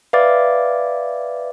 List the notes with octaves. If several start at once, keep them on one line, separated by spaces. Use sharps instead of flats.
B4 D5 E5 F5 D6 A6